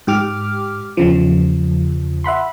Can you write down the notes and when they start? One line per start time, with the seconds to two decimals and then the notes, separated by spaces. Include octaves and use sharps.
0.07 G#2 G4 D6 F6
0.97 E2 C#3 F3
2.24 E5 F#5 B5 C6